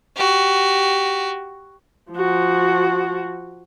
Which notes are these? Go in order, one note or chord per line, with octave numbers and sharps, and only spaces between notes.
F#4 G4
F3 F#4